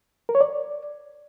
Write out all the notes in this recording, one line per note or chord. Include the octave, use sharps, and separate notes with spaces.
A#4
C#5
D5